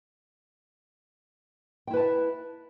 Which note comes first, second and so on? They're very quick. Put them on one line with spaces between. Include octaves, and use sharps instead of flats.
G5 E4 B4 A5 E5